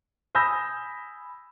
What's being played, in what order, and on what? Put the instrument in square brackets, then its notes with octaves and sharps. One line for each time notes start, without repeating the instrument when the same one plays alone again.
[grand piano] G#5 B5 D#6 E6 G6 A#6